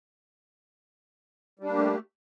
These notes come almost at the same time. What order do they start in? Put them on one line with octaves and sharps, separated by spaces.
G3 D4 A#3 G4 A3